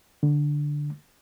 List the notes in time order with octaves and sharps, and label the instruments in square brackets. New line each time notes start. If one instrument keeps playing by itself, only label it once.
[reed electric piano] D3